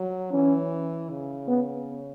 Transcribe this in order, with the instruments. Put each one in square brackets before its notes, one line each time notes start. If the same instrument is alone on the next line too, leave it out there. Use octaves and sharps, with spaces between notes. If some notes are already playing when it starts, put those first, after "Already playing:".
Already playing: [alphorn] F#3
[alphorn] E3 [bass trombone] C#4
[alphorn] C#3
[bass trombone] B3